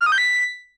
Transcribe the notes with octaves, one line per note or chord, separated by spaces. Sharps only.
F6
D#6
G6
B6